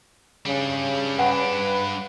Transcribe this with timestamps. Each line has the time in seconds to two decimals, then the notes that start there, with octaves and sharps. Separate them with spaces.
0.46 C#3 G3 D4
1.19 G2 D4 B4 F#5 G5